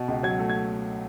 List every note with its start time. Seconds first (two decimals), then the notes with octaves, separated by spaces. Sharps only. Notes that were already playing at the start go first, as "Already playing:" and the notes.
Already playing: B2
0.08 C#2
0.23 F#3 G#6
0.39 A3
0.49 G#6